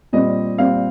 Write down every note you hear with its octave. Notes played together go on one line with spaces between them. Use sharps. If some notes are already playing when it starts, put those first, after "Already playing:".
A#2 G3 C4 D#5
A#2 G3 C4 F5